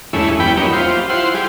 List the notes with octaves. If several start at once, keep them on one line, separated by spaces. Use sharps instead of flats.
E2 G2 G#3 A3 C#4 E4
E2 G3 B3 G4 G5 B5
F#3 A#3 C#4 D#4 E4
F4 G4 C5
E4 F4 C5 F#5 C6
G3 G4 G#4